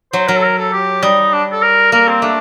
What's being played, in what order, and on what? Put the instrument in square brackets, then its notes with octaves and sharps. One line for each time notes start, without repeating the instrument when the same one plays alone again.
[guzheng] F#3 [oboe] C5
[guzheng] F#3 [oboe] A#4
[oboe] A4
A#4
A4
G4
[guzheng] G3 [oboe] D#4
[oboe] D4
A4
A#4
[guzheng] A#3 [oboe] A#4
[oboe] C4
[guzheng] A3 [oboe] D4